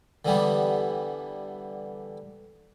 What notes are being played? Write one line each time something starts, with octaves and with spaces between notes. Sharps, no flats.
D3 E3 G3 B3